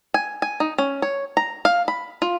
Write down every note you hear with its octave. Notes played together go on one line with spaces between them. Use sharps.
G#5
G#5
D#4
C#4
C#5
A#5
F5
B5
F4